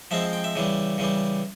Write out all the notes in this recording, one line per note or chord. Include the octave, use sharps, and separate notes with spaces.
F3 G#3 C4 E5
G5
E5
C#3 E3 G3
C#3 E3 G3